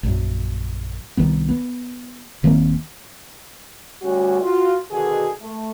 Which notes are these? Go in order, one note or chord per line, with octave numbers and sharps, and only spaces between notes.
A#1 F#2
C2 D#3 B3
B3
D#1 D#3 A#3 C4
D2 G3 C#4 F#4
F4 F#4
B2 D3 D#3 F#4 G#4
A3